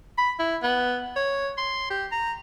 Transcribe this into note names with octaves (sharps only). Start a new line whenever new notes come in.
B5
E4
B3
C#5
C6
G4
A#5